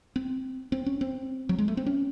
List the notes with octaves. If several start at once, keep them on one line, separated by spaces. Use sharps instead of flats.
C4
C4
C#4
C4
F#3
G#3
A3
C4
C#4